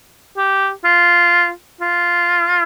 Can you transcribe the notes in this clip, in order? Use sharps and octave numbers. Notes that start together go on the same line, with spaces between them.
G4
F4
F4